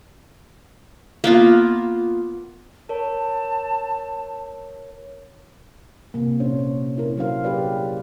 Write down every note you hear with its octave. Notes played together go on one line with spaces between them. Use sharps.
A#3 B3 F4
A#4 C#5 A5
C3 A#3
A#2 C#4 D4 C5 C#5
C#5
E4 A#4
F#3 D4 A#4 C5 F5
G4 G#4 B4 D5